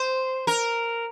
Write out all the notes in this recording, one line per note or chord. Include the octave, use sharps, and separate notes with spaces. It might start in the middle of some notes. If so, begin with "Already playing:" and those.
Already playing: C5
A#4